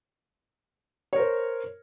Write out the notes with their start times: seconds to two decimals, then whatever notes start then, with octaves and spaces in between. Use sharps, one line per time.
1.13 C#5
1.16 A#4
1.19 C5